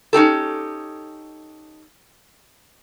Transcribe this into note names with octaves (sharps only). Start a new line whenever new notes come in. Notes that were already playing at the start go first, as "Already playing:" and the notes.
C#4 D#4 G4 A4